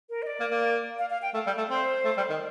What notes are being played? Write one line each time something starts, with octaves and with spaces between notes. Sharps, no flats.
A#4
D#5
D5
A#3
A#3
F5
F5
G5
A3 F5
G3
A3
C4 C5
A3
G3
D#3